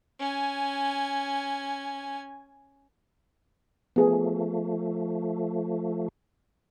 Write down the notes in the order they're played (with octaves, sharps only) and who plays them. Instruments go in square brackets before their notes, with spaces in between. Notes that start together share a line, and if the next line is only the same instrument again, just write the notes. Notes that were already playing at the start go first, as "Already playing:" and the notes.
[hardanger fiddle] C#4 G#5
[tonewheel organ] F3 A3 [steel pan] B3 G#4